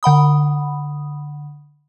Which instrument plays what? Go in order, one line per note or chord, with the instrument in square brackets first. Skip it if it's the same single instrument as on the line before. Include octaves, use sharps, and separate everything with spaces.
[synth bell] D3 F#5 B5 D#6